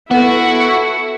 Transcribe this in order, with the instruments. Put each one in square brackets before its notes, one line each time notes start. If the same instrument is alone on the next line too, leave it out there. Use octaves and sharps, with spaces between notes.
[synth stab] B3 [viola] E4 [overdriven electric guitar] F#4 [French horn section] A4